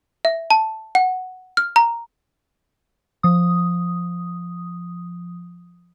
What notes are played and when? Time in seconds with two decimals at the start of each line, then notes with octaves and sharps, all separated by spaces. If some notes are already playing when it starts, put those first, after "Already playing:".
0.25 E5
0.50 A5
0.95 F#5
1.57 F6
1.76 A#5
3.23 F3 D#6